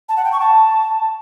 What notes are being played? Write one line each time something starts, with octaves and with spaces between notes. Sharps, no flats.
A5
F#5
G5
C#6
A5